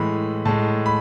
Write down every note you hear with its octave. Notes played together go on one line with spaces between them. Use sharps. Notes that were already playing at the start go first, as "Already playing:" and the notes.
Already playing: A2 E3 G#3 B5
A2 G#3 A5
B5